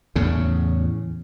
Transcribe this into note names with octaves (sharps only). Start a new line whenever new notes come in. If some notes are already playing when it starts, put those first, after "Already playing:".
E2 A2 C#3